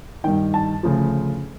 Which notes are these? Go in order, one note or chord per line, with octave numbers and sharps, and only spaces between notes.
G2 D#3 G5
A5
D2 C#3 F3